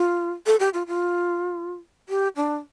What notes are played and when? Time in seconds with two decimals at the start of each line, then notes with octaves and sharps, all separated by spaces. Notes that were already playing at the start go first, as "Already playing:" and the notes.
Already playing: F4
0.47 A4
0.60 G4
0.74 F4
0.87 F4
2.09 G4
2.36 D4